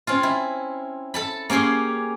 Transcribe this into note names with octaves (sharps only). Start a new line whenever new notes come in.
C4 C#4 F4
E4
A4 A5 B5
A#3 C#4 G4 G#4 C6